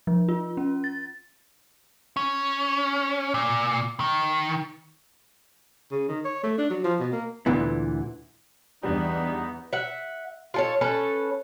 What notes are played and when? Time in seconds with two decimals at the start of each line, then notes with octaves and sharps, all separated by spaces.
0.07 F3
0.29 F4
0.57 C#4
0.84 A6
2.17 C#4
3.34 A#2
4.00 D#3
5.91 C#3
6.08 D#3
6.25 C#5
6.44 A3
6.58 D4
6.70 F#3
6.84 F3
7.00 B2
7.12 A#3
7.46 D2 A#2 D3 E3 B3
8.83 E2 G3 B3 D4 D#4
9.73 E5 F#5
10.54 F4 A4 C#5
10.81 C#4 A4 B4